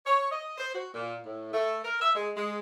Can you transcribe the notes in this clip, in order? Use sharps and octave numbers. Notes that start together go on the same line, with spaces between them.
C#5
D#5
C5
F#4
A#2
A2
A3
A#4
E5
G#3
G#3